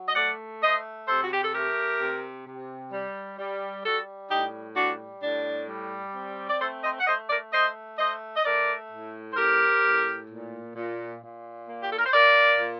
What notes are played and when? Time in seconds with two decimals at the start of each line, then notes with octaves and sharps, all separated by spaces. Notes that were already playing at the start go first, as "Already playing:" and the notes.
Already playing: F#3
0.08 D#5
0.15 A3 D5 F#5
0.62 A3 C5 D#5
1.08 C3 A4 C5
1.23 F#4
1.33 G4
1.44 A4
1.54 A3 G4 A#4
2.00 C3
2.46 C3
2.92 G3
3.38 G3
3.84 G3 F#4 A4
4.30 A2 D#4 G4
4.76 G3 D4 F#4
5.22 A2 D4
5.69 G3
6.15 C4
6.49 D5
6.60 A3 A4 C5
6.83 C5 D#5
7.00 F#5
7.07 A3 C5 D#5
7.30 A#4 D5
7.53 A3 C5 D#5
7.99 A3 C5 D#5
8.37 D#5
8.45 A3 A#4 D5
8.91 A2
9.32 C5
9.37 C4 G4 A#4
9.84 A2
10.29 A#2
10.76 A#2
11.22 A#2
11.67 A#3
11.83 G4
11.92 A4
11.99 A#4
12.06 C5
12.13 A#3 A#4 D5
12.60 A#2